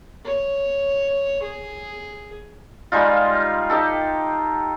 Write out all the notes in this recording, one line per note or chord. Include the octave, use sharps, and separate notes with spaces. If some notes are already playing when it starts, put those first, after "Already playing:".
C#5
G#4
G3 G#3 D#4 F4
D#4 G4 A4